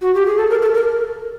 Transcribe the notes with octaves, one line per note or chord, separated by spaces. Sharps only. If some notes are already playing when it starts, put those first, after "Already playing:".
F#4
G4
G#4
A4
A#4
A4
A#4